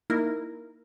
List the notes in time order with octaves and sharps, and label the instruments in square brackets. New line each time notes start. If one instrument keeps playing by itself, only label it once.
[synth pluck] A#3 D#4 E4 A#4